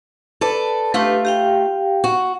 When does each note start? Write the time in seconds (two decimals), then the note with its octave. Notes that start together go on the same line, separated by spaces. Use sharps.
0.41 A4 B4 D5
0.94 A3 D4 F4 G4 B4
1.25 G4 F5 G5
2.04 F#4